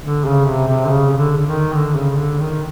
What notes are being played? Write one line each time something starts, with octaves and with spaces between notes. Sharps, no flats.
D3
C#3
C3
C3
D3
C#3
C#3
D3
D3
D#3
D3
C#3
D3
D#3